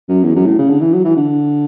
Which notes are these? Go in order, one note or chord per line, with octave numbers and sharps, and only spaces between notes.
F#2
E2
F#2
A2
C#3
D3
E3
F#3
E3
D3